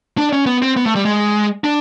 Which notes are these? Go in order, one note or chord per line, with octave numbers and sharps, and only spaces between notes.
D4
C#4
B3
C4
B3
A3
G3
G#3
D4